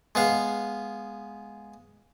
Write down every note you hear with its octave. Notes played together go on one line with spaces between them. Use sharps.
G#3 B3 F5